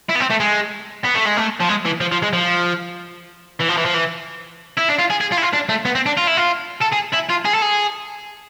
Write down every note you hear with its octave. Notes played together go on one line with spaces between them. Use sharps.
E4
B3
C4
A3
G#3
B3
A3
G#3
A3
F3
G#3
E3
F3
F3
G#3
F3
E3
F3
E3
F3
E3
E4
D4
F4
G#4
G#4
F4
E4
F4
D4
A3
B3
C4
D4
F4
E4
F4
A4
G#4
E4
F4
G#4
A4
G#4